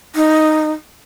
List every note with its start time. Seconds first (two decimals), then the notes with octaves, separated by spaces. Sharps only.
0.16 D#4